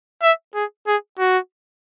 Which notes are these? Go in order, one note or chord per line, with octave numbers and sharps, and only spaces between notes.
E5
G#4
G#4
F#4